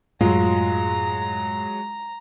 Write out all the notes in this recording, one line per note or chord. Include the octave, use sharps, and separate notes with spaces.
F#2 A2 F#3 G#3 F4 A#5